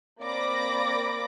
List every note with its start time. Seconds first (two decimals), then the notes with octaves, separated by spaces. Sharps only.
0.21 A#3 C4 D5 B5 D6 A#6